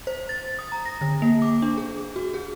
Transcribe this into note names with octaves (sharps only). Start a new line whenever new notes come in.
C5
A6
D#6
A#5
A#6
D3
A#3
D6
D4
G#4
F#4
G#4